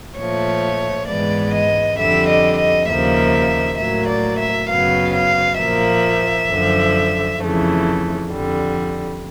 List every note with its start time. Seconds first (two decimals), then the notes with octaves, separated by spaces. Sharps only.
0.18 A#2 F3 A3 C#5
1.08 G#2 E3 G#3 B3 D5
1.54 D#5
1.98 F2 D3 G3 E5
2.29 D#5
2.59 D#5
2.89 D#2 C#3 F3 A#3 E5
3.79 A2 F#3 A#3 E5
4.09 D5
4.39 E5
4.70 F#2 C#3 F#3 B3 F5
5.14 F5
5.59 A#2 F3 A#3 E5
6.49 F#2 D3 F3
7.40 F2 C#3 E3 A3
8.30 F2 D3 G3